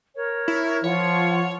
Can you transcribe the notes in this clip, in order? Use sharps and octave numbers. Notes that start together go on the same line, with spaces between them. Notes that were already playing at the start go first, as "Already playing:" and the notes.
A#4 C#5
E4
F3 F4 C#5 F#5